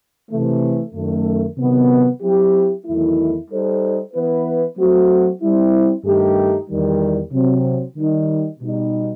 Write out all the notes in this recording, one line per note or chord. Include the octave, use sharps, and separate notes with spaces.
C3 E3 A3
F#2 D#3 A3
C3 D#3 F#3 B3
F#3 C4 E4 G4
E2 D#3 F#3 A3 E4
G3 D#4 A4 C5
E3 B3 E4 B4
F#3 A3 C4 F#4
G3 C4 E4
G2 D#3 A3 D#4 G4
E2 D#3 G3
C3 F#3 C4
D#3 G3 D#4
B2 G3 D#4